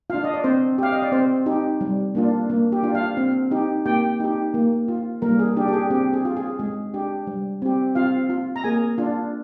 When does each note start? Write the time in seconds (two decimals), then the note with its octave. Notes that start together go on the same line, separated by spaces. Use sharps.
0.10 D4 F4 F5
0.24 D#5
0.34 D5
0.44 C4 C5
0.78 G4 F5
0.92 D#5
1.02 D5
1.12 C4 C5
1.46 D#4 G4
1.81 G3
2.15 A#3 D4 F4
2.50 A#3
2.72 G4
2.83 D4 F4
2.95 F4 F5
3.17 C4
3.51 D#4 G4
3.86 A#3 G4 G5
4.20 D#4 G4
4.54 A#3
4.88 F4
5.22 G3 A#3 A#4
5.39 G#4
5.57 D4 G4
5.68 G4
5.73 G#4
5.90 C4 G4
6.13 G#4
6.25 F4
6.37 G#4
6.59 G#3 G#4
6.94 D4 G4
7.27 G3
7.62 C4 G4
7.95 C4 F4 F5
8.30 F4
8.56 A#5
8.64 A#3 G#4 G#5
8.98 D4 F4